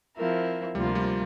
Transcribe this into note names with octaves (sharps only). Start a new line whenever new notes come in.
F3 C4 E4 A#4
D2 C3 F3 G3 A#3 F4
G3